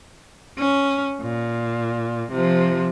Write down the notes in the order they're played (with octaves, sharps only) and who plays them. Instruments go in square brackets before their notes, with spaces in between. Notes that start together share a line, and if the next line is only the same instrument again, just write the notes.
[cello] C#4
A#2
C3 F3